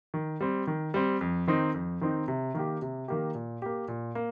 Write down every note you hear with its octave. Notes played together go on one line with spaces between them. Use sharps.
D#3
G3 C4
D#3
G3 C4
F2
D#3 C4 D#4
F2
D#3 C4 D#4
C3
D#3 A#3 G4
C3
D#3 A#3 G4
A#2
A#3 G4
A#2
A#3